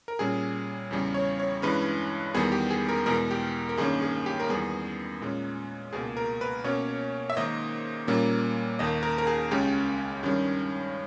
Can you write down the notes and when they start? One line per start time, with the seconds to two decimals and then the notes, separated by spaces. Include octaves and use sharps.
0.08 A#4
0.19 A#2 G3 C#4 G#4
0.91 E2 C#3 G3
1.14 C#5
1.40 C#5
1.62 G2 E3 G#3 C#4 B4
2.34 E2 D#3 G3 B3 G#4
2.52 G4
2.70 G#4
2.89 A#4
3.06 E2 B2 G#3 A#4
3.31 G4
3.69 A#4
3.77 G2 D#3 A#3 C#4 G#4
4.02 G#4
4.26 G4
4.40 A#4
4.49 E2 D#3 G3 B3 G#4
5.21 A#2 G#3 C#4
5.93 C#2 B2 A#3 G#4
6.17 A#4
6.41 B4
6.64 B2 A#3 C#4 C#5
7.30 E5
7.37 G#2 D#3 A#3 D#5
8.07 A#2 G3 A#3 C#4
8.79 D#2 D#3 A#3 D#5
9.03 A#4
9.18 A#4
9.27 G#4
9.51 C#2 C#3 G#3 C#4 G4
10.23 G2 D#3 G3 C#4